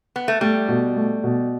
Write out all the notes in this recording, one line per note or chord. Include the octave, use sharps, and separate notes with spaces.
B3
A3
G3 A3
B2
A3
B2